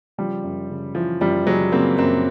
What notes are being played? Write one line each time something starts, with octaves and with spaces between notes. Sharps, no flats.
C#3 F3 G3
F#2
C#3
E3 F3
F#2 F3 G3
C#3 F#3 G#3
C#3 A#3 C4
F#2 A#3 C4